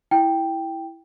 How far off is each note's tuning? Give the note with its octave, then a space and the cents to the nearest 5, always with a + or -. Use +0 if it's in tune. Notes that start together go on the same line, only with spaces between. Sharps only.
E4 +0 G5 +0